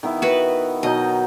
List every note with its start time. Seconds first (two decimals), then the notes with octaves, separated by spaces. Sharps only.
0.03 D#3 B3 E4
0.22 F#4 B4
0.83 B2 F#3 D#4 D#5